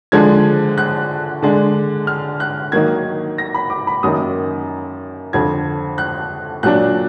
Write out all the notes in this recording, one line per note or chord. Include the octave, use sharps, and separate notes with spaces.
D3 F3 G#3 D4 G#6
F#6
D3 G#3 D4
F6
F#6
D#3 F#3 A#3 D#4 G#6
A#6
B5
D6
B5
F#2 D#3 A#3 D#4 D#6
F2 D3 F3 G#6
F#6
A#2 F#3 D4 F#6